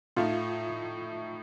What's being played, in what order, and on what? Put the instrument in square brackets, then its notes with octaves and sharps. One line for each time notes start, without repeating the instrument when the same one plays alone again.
[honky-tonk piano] A2 A3 D#4 [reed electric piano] F4